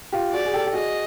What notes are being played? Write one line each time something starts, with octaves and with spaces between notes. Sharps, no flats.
F4 G4
F#4 G#4 D5
G#4
G4 A4
G4
F#4 G#4 D#5